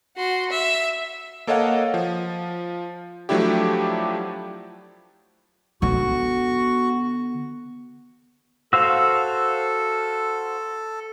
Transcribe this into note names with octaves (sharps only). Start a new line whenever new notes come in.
F#4 C6
E5
A#3 A4 C#5 D#5 F5 F#5
F3
F3 F#3 A3 D4 E4 G4
D3 B3 F#4 C#6
F#4 A4 C5 F5 E6